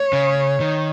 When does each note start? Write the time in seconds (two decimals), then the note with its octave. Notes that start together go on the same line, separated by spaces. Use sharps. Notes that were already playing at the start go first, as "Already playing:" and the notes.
Already playing: C#5
0.13 C#3
0.60 D#3